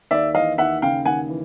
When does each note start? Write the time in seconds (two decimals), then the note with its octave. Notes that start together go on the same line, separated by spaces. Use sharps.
0.11 D#2 D5 E5
0.35 E3 D#5 F5
0.58 D#2 E5 F#5
0.82 C#3 F5 G5
1.05 D#2 F#5 G#5
1.29 E3